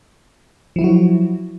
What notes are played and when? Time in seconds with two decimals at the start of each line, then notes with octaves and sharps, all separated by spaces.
0.76 F3
0.79 E4
0.81 F#3
0.84 F#4